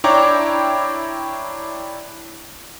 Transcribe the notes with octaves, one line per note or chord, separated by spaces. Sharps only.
D4 E4 C#5 G5 A#5 D6